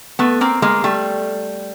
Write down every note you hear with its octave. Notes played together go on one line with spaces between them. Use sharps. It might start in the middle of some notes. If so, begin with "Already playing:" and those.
A3 B3
A#3 C4
G#3 A#3
G3 A3